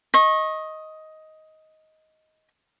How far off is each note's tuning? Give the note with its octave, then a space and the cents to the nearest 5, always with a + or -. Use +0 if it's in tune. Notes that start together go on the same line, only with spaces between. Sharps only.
D#5 +10 C#6 -25